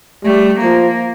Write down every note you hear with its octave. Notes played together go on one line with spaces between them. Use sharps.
G3 A3
F3 A#3